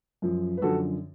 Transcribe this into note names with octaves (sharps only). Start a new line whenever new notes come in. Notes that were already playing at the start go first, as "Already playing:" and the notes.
F#2 F3
B4
F#2 D3 F3 F#4 A4